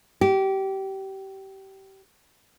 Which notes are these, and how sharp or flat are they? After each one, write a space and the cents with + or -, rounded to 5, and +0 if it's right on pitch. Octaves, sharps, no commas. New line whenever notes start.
G4 -25